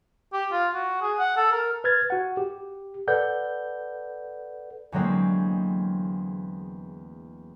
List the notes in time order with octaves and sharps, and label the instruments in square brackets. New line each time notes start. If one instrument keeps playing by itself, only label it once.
[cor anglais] G4
F4
F#4
G#4
F#5
A4
A#4
[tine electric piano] B4 F6 G#6 A6
F#4 F#5
G4
A4 B4 D5 F#5 G6
[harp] E2 D3 F#3 G#3 A#3 C4